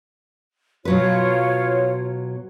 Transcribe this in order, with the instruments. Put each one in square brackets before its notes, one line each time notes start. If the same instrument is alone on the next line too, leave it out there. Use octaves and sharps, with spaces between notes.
[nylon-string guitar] B2 F#3 B4 [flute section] F4 C#5